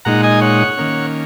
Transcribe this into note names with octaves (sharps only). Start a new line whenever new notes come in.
A#2 G#3 D#4 F#5 A#5
D#5 G#5
C#5 F#5
D#3 A#3 C#4